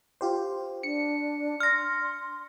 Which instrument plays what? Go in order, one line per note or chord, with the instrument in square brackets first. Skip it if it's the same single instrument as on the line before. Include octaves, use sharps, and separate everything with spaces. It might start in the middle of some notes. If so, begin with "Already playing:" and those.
[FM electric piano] F4 G4 C5
[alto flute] D4 [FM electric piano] C#7
[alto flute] C6 [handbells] F6 A#6